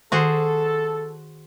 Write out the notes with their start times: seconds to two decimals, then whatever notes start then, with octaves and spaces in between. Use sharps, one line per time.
0.12 D#3 F#4 G#4 A4 C5